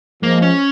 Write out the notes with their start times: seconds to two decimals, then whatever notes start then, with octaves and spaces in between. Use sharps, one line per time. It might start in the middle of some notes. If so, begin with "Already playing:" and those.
0.23 F3 G#3 A#3
0.42 C#4